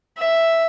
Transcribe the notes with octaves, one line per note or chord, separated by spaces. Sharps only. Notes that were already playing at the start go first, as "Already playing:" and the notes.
E5